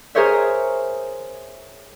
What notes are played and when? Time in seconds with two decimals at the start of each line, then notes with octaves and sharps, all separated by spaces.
0.15 G#4 A#4 C5 C#5 E5